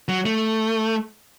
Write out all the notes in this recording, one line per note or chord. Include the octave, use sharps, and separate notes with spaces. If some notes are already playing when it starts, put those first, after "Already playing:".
F#3
A3